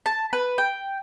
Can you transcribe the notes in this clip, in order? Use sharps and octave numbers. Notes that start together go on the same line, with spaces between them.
A5
B4
G5